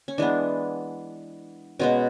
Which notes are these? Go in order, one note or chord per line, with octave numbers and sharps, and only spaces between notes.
C#4
E3 G#3 B3 D4
B2 G#3 B3 C#4